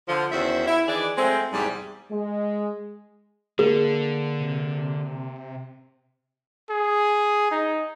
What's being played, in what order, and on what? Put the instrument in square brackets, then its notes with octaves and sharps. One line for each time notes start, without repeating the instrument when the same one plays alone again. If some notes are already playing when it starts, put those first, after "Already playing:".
[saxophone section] D3 F3
E2 D#3 C#4 F#4 C5 E5
E4
D#3 E3 D4 G#4 D5
F#3 G#3 A3 C4
E2 G#2 C3 G3
[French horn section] G#3
[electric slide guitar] D3 [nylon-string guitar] A#3 [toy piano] G#4
[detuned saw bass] C3
[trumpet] G#4
D#4